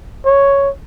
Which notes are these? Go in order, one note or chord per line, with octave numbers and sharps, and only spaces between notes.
C#5